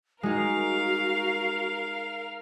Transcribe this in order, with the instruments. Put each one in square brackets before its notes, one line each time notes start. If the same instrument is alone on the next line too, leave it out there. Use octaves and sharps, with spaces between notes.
[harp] G#3 D#4 [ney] F#4 [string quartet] A#4 F5